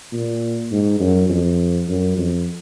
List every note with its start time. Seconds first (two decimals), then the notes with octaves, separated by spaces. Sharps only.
0.13 A#2
0.72 G#2
1.00 F#2
1.30 F2
1.88 F#2
2.18 F2